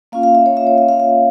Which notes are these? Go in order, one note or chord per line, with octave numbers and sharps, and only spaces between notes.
A#3 C#4 F4 F5
F5
E5
C#5
E5
C#5
E5
F5
F5